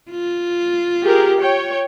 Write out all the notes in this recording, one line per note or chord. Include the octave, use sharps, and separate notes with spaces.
F4
G4 G#4 A#4
C#5 G5